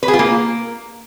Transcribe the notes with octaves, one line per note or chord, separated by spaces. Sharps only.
B4
G#4
F4
A#3